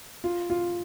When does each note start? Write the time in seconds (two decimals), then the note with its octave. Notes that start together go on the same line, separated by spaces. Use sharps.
0.24 F4
0.50 F4